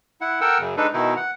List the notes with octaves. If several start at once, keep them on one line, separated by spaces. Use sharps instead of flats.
E4 F#5
A4 A#4 F#5 G5 E6
F#2 C#3
G#3 D4 D#4 A4 B4
B2 D#3 D#4 E4
F#5